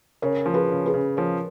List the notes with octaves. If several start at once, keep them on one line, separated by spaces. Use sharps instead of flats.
C#3 A#4 C#5
F3
G#4 B4
C#3
G#4 B4
C#3
F3 A#4 C#5